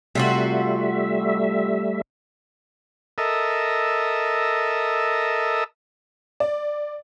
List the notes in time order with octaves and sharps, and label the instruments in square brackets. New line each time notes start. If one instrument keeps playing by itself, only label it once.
[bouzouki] C3 F4 F#4 [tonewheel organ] G3 A3 E5
[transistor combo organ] A4 A#4 D#5 E5
[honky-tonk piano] D5